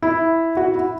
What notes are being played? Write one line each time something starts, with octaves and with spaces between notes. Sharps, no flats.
E4
F#4
E4